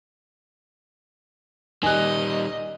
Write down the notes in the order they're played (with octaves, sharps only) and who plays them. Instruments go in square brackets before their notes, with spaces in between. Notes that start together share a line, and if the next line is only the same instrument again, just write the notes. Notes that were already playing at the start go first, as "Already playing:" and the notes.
[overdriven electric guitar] D#3 G3 [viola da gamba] D#5 [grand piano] G#5 F#6